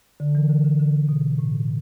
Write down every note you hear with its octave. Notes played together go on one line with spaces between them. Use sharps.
D3
E3
D3
D3
D3
D3
B2
A2